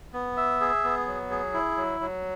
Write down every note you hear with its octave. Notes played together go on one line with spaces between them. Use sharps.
B3
E5
G#4
B3
F#3
G#4
E4
F#3
F#3